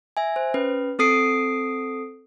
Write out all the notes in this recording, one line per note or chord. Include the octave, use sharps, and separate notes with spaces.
E5 G#5
C5
C#4 B4
C4 A4 D#6 C7 D7